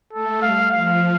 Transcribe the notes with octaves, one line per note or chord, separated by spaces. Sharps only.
A3 A4
G3 F5
F3 F5